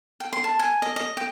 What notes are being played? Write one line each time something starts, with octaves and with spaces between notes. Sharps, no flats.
G5
C6
A5
G#5
D#5
D#5
G5